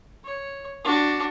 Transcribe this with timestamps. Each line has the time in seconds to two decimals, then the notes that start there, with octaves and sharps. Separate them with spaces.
0.24 C#5
0.84 D4 F#4